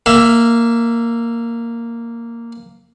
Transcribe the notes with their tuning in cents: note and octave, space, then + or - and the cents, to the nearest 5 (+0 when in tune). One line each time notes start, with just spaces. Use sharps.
A#3 -5 E5 +15